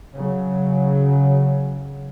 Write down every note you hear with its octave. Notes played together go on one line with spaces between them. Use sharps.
C#3 F#3